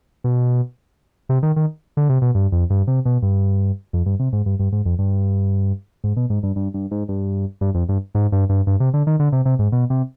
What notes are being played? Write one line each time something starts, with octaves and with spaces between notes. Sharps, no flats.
B2
C3
D#3
D#3
D3
C3
B2
G2
F2
G2
C3
B2
G2
F2
G2
C3
G#2
G2
G2
G#2
F2
G2
G#2
B2
G#2
G2
G2
G2
G#2
G2
G2
F2
G2
G#2
G2
G2
G2
C3
D3
D#3
D3
C3
C3
G#2
B2
C3